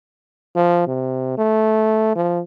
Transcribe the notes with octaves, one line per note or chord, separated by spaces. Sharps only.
F3
C3
A3
F3